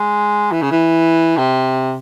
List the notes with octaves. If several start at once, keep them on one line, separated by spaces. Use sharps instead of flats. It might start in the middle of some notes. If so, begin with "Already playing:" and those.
Already playing: G#3
E3
C#3
E3
C3